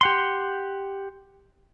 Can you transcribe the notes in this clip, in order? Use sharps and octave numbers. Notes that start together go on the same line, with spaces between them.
G4 F#5 C6